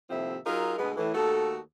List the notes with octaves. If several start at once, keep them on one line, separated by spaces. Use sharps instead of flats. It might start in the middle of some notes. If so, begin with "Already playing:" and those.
D#2 A2 C3 F3 C4 E5
F#3 D#4 F4 G#4 A#4
D2 B2 G#3 B3
A2 E3
D#2 A3 F#4 A4